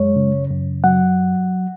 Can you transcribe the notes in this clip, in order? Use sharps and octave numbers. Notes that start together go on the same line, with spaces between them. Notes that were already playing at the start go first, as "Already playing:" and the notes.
Already playing: F#2 G#3 C#5
C#3
F#2
F#3 F#5